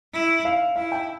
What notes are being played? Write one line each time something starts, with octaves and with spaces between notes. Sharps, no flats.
E4
F5
E4 F5
G5